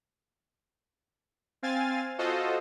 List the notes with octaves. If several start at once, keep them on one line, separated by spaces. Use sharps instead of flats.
C4 F5 G#5 A6
F4 F#4 A4 C5 D#5